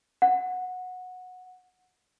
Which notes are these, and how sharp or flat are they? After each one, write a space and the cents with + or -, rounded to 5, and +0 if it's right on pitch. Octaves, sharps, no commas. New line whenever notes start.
F#5 -15